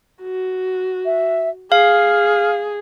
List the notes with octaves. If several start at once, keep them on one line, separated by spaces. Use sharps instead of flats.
F#4
E5
G#4 F5 F6